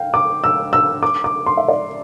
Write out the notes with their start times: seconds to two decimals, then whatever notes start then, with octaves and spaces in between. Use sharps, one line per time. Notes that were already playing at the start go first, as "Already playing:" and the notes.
Already playing: F5 G5
0.14 D6
0.44 E6
0.73 E6
1.03 D6
1.24 D6
1.46 C6
1.57 E5
1.68 D5